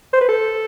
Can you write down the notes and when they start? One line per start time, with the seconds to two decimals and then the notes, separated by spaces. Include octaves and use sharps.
0.13 C5
0.21 B4
0.29 A4